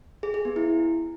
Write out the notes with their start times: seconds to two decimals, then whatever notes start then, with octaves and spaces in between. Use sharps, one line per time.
0.23 G#4
0.34 G#4
0.45 B3
0.56 E4